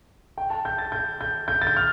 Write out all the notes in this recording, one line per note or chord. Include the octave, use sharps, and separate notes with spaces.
G5
A5
G6
A6
G6
G6
G6
A6
G6
F6